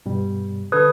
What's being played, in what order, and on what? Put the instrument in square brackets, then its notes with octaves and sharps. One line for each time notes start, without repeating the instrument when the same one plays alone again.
[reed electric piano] G2 B2 G3
[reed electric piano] D3 A4 [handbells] B4 D#6 G#6